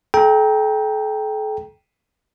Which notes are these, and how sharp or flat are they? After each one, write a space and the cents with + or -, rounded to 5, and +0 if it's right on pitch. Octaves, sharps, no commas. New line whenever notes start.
A4 -40 G5 +0 A#5 +10